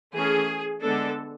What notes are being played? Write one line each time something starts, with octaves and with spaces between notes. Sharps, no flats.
E3 A3 C#4 G#4
D3 G#3 B3 D4 A4